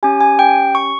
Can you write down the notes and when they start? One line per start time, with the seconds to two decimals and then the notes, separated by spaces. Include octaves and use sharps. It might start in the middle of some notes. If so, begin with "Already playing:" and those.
0.03 C#4 G4 G#5
0.20 G#5
0.39 G5
0.75 C#6